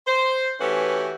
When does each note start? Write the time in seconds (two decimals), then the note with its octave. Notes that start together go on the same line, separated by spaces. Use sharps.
0.07 C5
0.60 E3 A3 C#4 F#4 G4 B4